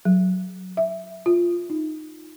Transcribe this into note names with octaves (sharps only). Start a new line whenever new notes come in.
F#3
E5
F4
D#4